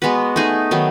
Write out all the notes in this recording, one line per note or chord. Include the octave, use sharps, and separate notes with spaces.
G#3 B3 F#4 B4
A3 D#4 G#4
D#3 F#3 B3